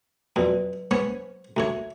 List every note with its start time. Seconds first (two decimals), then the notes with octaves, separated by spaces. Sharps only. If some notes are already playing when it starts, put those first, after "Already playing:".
0.36 F2 B2 F#3 B4 D5
0.91 B3 C#4 C5 C#5
1.57 D2 D3 C#5 E5